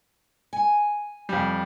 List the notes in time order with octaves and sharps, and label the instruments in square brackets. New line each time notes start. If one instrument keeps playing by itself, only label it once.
[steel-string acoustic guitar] G#5
[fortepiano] F2 G3